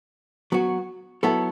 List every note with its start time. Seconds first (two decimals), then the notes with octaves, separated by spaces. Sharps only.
0.52 F#3 B3 F#4
1.23 F#3 B3 E4 A4